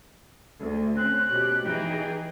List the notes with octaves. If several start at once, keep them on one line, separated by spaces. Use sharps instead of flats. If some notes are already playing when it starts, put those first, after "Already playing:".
D2
C4 C#4 F#6
B2 G4
E3 D#4 G#4 G5